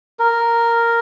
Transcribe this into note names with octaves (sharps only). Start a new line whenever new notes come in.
A#4